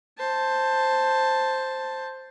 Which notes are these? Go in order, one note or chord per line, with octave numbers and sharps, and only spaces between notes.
C5 A5